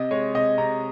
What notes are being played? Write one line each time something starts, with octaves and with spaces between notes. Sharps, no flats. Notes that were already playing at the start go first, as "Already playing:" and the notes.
Already playing: C3 D#5
G#3 C#5
C3 D#5
C3 A#5